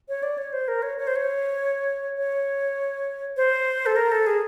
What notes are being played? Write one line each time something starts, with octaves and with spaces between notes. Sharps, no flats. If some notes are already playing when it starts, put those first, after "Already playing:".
C#5
D5
C#5
C5
A#4
C#5
C#5
C5
C#5
C#5
C5
A4
A#4
A4
G#4